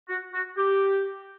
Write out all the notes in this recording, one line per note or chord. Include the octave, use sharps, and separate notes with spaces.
F#4
F#4
G4